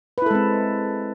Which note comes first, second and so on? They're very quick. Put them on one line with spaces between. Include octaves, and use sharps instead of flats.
B4 E4 A4 G#3 C4